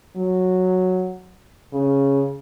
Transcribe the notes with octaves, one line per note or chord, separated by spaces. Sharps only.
F#3
C#3